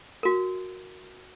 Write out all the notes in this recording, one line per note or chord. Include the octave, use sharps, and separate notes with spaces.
F#4 A#4